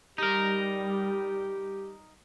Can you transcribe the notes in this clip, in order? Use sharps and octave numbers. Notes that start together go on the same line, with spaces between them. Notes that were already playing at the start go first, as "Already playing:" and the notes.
G3 D#4 G4 A#4